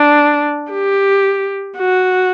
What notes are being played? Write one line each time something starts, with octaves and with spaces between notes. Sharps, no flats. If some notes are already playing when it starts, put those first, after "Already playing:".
Already playing: D4
G4
F#4